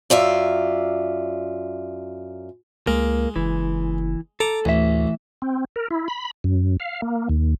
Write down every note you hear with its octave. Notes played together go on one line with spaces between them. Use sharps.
F#2 F4 D5 E5
C#2 G#3 A#3
F#1 E3
A4 A#5 D6
A1 D2 E3 E5
C4
A#4
E4
B5
F#2
F5
A#3
D#2